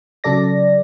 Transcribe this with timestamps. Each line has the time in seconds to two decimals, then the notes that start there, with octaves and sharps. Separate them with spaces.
0.24 C#3 F#3 A4 D5 A#6